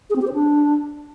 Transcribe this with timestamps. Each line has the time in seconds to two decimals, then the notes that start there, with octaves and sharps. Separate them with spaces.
0.10 G#4
0.16 C4
0.22 G4
0.27 C5
0.33 D4